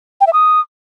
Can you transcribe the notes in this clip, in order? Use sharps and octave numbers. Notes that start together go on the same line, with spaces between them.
G5
E5
D#6